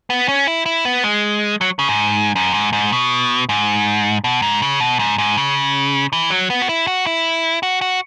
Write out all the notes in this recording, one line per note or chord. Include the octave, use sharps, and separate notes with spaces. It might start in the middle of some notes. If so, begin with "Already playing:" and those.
B3
C#4
E4
E4
B3
G#3
F#3
C#3
G#2
F#2
G#2
G#2
B2
G#2
B2
G#2
C#3
B2
G#2
G#2
C#3
E3
F#3
B3
F#4
E4
F#4
E4
F#4
F#4